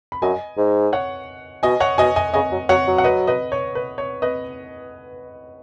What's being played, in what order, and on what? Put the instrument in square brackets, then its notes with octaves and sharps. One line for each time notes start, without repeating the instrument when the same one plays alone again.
[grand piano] B5
[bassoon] F#2 [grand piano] D#5 G#5
[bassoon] G#2
[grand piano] C#5 F#5
[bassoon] B2 [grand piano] D#5 G#5
[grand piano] C#5 F#5
[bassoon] B2 [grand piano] D#5 G#5
[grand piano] D#5 G#5
[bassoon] C#3 [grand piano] D#5 G#5
[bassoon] F#3
[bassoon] F#3 [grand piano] C#5 F#5
[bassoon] F#3
[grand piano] F#5
B4 D#5
B4 D#5
C#5
B4
C#5
B4 D#5